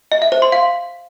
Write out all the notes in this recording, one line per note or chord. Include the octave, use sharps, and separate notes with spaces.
D#5
E5
C5
C6
F5